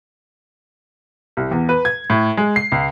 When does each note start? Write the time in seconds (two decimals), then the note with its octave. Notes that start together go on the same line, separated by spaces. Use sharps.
1.37 C2
1.51 E2
1.69 B4
1.85 G#6
2.10 A2
2.37 G#3
2.56 C7
2.72 C#2